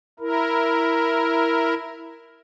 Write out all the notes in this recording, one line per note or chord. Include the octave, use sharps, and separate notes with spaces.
E4 A#4